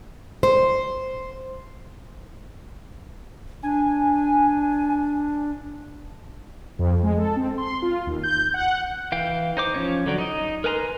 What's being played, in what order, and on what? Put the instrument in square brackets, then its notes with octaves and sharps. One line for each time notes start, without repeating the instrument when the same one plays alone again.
[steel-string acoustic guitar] C5
[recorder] D4 [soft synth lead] G#5
[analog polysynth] F2
G#3
A4
C4
C6
F4
D#2
G6
F#5
[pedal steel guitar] E3 F5 G5
D#4 C5 D6
F3 C#4 C#5
D3 F#3 D5
D#4 D#5
A#4 B4 G#5 A#5 C6